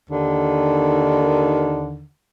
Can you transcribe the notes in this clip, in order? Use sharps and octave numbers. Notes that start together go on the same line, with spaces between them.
D#2 D3 D#3